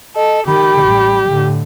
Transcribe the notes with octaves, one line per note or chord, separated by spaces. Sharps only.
A4 D#5
D#3 G4 B5
A1 G3
A2 D3